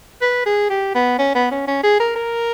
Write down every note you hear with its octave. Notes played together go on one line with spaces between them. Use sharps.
B4
G#4
G4
B3
C#4
B3
C#4
C#4
G#4
A#4
A#4